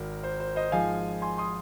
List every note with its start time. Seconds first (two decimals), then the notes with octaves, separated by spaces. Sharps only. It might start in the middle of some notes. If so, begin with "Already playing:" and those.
Already playing: G#1 A#4
0.23 C5
0.40 C5
0.56 C5 D#5
0.72 G#2 F3 G#3 F5 G#5
1.22 G#5 C6
1.38 C6 D#6